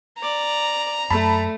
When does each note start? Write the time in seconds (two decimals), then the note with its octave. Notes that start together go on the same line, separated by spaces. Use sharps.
0.23 D5 A#5
1.10 F#2 A3 A5 B5